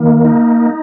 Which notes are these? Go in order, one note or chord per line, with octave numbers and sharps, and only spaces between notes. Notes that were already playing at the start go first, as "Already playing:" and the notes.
Already playing: D#3 A#3
D#4